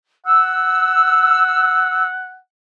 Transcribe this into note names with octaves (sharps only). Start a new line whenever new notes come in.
F#5 E6